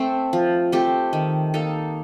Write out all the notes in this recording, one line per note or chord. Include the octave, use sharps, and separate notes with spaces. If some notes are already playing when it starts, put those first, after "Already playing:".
Already playing: A3 C4
F3
A3 C4 G4
D#3
A#3 D#4 A4